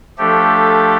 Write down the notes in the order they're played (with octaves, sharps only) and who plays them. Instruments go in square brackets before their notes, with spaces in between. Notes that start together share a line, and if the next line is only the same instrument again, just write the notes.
[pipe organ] F3 A3 D4 G4 [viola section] A4